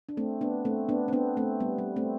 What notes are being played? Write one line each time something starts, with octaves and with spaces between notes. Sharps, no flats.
D4
A3 C4
B3 D4
A3 C4
B3 D4
C4
B3 D4
A3 C4
G3 B3
G3
A3 C4